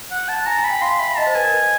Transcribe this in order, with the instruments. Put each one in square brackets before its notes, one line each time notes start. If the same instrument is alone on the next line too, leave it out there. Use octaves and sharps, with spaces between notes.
[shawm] F#5
A5
[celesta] G#5 [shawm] A#5
[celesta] G#5
[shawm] B5
[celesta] G5
[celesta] F5 [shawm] C6
[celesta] E5 [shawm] B5
[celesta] D#5 [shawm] A5
[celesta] C5
[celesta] B4 [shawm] G#5
[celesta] A#4
B4